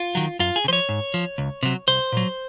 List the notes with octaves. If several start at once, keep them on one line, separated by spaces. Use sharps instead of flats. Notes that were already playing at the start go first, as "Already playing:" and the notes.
Already playing: F4
D#3 F#3
F#2 F4
G#4
C#3
F3 C5 C#5
G#2
F3
C#2
C3 F#3
C2 C5
A#2 F#3